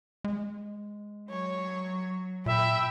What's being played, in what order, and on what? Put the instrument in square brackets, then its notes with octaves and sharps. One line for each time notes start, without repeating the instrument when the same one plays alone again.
[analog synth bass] G#3
[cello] F#3 [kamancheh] C#5
[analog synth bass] A#2 [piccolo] E5 [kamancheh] G5 B5